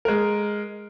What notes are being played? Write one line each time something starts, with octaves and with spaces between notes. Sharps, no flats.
G#3 A#4